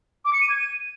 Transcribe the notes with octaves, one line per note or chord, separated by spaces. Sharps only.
D6
C#7
D#7
G#6
D#7